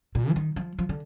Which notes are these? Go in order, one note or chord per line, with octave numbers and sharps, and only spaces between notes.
A#2
F3
D#3
F3
F3
D3